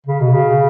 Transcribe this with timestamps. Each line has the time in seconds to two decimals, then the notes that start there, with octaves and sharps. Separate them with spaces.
0.06 C#3
0.20 B2
0.34 C#3